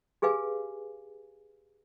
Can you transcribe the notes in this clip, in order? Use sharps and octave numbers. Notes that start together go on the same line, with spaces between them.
G4 G#4 B4 F5 G#5